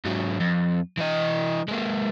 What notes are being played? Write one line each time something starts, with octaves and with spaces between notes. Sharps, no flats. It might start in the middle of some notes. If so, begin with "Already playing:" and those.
G#2 F#3
F2
E3 D#5
G#3 A#3